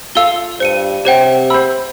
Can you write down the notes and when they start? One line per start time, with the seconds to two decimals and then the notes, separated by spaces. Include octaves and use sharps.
0.15 F4 A4 F5 E6 G7
0.60 G2 C5 C#7 D#7
1.05 C3 G4 C5 C#5 F#5 G5
1.50 C5 B5 E6